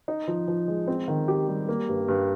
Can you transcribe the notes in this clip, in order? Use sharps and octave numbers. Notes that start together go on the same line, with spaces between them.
D#4
F3
F3
G#3
C4
D#3
G4
G3
A#3
G2
G2